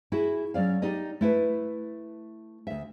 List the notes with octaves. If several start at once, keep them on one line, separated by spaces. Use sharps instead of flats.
E4 F#4 G#4 E5
F#3 C#4 D5 F5
D#4 G4 D5 D#5
A3 E4 B4
D2 E5